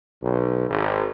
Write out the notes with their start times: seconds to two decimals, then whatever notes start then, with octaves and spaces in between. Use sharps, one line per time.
0.22 B1
0.69 G#1